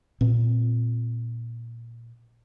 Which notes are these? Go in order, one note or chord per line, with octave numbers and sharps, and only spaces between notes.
A#2 C4